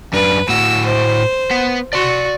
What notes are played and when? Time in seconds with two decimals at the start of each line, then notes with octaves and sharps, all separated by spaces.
0.13 F#2 D4 B4
0.49 A2 F#4 E6
0.86 C5
1.51 B3 B4
1.93 F#4 D5 C6